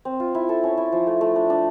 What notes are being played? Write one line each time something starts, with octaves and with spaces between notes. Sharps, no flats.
C4
F4
E4
A4
C#4
E4
F3
A3
A3
D4
D4